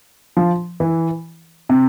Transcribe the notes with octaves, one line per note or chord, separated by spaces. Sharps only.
F3
E3
C3